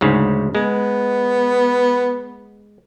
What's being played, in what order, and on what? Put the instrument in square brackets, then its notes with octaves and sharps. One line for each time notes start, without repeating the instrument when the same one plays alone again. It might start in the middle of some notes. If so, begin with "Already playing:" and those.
[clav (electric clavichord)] D2 G#2 C#3
[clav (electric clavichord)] G#3 [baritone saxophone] B3